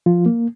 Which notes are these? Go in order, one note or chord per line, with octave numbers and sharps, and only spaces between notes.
F3 F4
A#3